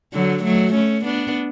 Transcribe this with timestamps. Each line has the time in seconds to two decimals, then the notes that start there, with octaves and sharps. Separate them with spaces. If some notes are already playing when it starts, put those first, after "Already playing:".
0.13 D3 F#3
0.44 F#3 A3
0.74 A3 C#4
1.05 B3 D4